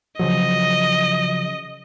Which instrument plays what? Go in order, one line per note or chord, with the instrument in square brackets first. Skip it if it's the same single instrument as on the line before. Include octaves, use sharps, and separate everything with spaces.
[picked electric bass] C#3 F3 F#3 [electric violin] D#5